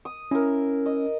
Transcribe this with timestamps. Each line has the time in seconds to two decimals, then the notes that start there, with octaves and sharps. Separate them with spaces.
0.05 D#6
0.31 C#4 E4 A#4
0.86 D#5